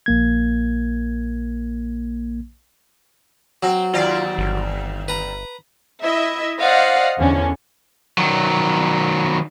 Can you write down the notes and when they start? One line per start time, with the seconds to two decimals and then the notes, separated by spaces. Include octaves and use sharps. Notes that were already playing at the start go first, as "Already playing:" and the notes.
0.06 A#1 A#3 G#6
3.63 F#3 C4
3.94 D#2 C4 F4 D5
4.38 G1
5.08 B4 A#5
6.03 E4 D#5 E5
6.60 C5 D5 D#5 F5 F#5
7.18 E2 D3 C#4
8.17 D#3 F#3